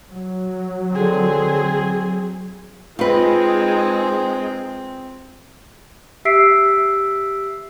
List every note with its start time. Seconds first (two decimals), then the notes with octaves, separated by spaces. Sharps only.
0.11 F#3
0.92 D3 C4 G#4
2.99 G#3 C4 D#4 F4 G#4 B4
6.25 G4 E5 E6 B6 C7 D7